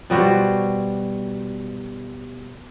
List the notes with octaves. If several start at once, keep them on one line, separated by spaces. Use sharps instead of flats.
B2 G3 F#4 C5